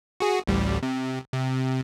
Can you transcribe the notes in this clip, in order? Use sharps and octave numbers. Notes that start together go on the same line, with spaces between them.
F#4 G#4
A1 D2 G3
C3
C3